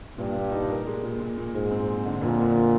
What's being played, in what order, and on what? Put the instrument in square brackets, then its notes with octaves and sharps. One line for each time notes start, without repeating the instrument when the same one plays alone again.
[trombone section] G2 [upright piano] A#2
[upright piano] A#2
D#4
A#4
G#3
A#2
A#2
A#2
[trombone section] G#2 [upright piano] G#3
[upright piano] C4
C4
D3
[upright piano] F2 [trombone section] A#2
[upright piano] D3